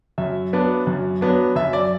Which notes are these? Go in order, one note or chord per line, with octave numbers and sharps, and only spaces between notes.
F#2 E5
F#3 B3 D4
F#2
F#3 B3 D4
F#2 E5
D5